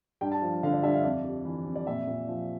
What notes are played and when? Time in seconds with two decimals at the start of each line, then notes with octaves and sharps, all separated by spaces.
0.21 G2 G5
0.32 A5
0.42 F3
0.63 D3 F5
0.73 D5
0.83 G2 E5
0.94 F5
1.04 F2 D5
1.24 G3
1.45 E3
1.65 F2
1.76 D5
1.87 A#2 E5
2.07 A#2
2.28 F3